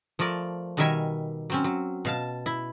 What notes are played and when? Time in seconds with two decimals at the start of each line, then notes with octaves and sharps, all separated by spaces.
0.19 F3 A3 A#4 D5
0.77 B2 D#3 G3 A#4 E5 G#5
1.50 F#3 C4 C#4
1.64 F#3
2.05 B2 F5 A5
2.46 E4